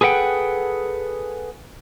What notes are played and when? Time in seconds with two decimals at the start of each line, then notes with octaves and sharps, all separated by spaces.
0.01 G#4 A4 B4 F#5 G5